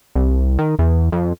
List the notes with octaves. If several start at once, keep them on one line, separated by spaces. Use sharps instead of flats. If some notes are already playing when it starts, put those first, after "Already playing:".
C2
D#3
E2
F2